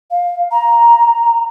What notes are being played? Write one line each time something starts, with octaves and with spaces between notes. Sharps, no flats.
F5
A#5